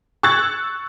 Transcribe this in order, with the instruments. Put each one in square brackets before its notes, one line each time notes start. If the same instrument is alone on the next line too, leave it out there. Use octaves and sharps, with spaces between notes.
[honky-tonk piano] C#6 E6 F#6 G#6 A6